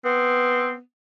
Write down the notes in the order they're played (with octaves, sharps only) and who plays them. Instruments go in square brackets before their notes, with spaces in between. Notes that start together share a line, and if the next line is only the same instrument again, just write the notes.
[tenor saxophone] B3 [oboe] C4